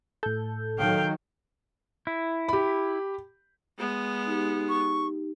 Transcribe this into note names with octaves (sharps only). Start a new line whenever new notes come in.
A2 A4 G6
D#3 F#3 F5 G5
E4
G4 B5
G#3 B3
D#4 G4
C#6